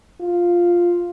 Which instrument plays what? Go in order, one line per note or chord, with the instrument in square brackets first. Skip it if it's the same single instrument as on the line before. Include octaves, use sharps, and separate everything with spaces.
[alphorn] F4